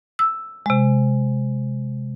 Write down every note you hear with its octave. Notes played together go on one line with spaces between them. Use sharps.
E6
C3 G#3